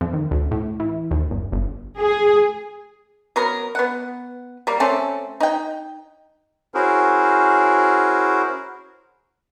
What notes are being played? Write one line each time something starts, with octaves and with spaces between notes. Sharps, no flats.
F2
D#2
D2
A2
E3
D#2
G1
G1
G#4
F#3 B3 A#4
B3 F#5
G3 A#3
A3 C4 C#4 A4
D#4 G5
C#4 E4 F#4 G#4 A#4 C5